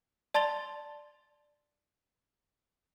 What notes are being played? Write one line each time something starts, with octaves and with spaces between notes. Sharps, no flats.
D5 A5 C6 A6 F7 G7